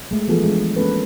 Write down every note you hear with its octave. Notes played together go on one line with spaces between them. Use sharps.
G#3 A3
E3 F3 B3 F4 G#4 A4
G#3 D4
G#3 A#3 C#4 A4 B4